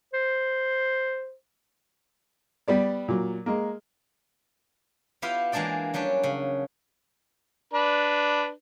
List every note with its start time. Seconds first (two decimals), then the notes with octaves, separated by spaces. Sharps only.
0.13 C5
2.68 G3 B3 D5
3.08 A#2 F#3
3.46 G#3 A#3
5.22 B3 E4 F4 G4 F5
5.52 E3 G#3 A#3 D4 D5 G5
5.94 F#3 G3 C#4 D4
6.23 C#3
7.73 D4 B4